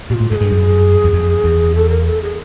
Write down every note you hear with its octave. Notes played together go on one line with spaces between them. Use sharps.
A#2 F4 G4
A2
G#2 G#4 A4
G2
F#2
E2
F2
E2
A4
A#4
A4
G#4